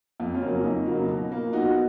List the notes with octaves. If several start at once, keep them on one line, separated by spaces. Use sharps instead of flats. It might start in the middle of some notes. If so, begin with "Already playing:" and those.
F2
C#4 F4
C#3 F#3 A#3
C#4
F2 D#4
C#3 F#3 A#3
B2
A#3
B2 D#4 F#4